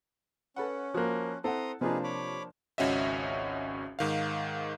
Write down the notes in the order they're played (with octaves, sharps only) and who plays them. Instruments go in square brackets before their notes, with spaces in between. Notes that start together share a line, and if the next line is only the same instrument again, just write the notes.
[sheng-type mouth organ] C#4 [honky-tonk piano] A4 B4 F#5
[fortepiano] F3 A#3 [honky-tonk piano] F#4 F#6
[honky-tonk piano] C4 E4 [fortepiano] A4 F#5 [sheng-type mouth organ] A#5 C6 D#6
[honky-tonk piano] C3 F4 [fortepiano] F3 A#3 D4 [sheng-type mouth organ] D#4 G#4 B4
[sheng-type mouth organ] C#5 B5 D6
[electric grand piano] G#1 C#2 C#4 F#4 D#5 E5
G#2 D#3 F5